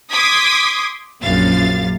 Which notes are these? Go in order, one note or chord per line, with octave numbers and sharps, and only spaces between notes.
C6 D6 D#6 G#6 B6
A#1 F#2 F5 A6